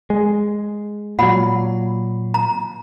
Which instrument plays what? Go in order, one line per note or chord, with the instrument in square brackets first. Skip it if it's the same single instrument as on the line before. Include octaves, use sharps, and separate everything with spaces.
[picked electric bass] G#3
[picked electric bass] A#2 F#3 [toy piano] F#5 B5
[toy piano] A#5